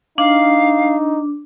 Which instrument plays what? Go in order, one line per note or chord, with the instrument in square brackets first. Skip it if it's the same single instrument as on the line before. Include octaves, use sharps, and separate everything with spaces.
[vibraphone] D4 [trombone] D#4 [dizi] F5